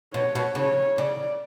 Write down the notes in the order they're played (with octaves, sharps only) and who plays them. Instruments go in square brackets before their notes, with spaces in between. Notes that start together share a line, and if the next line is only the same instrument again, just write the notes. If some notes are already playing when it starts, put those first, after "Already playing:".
[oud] B2 [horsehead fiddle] C#5
[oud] B2
[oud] C#3 [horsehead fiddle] C#5
[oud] C#3 [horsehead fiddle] D5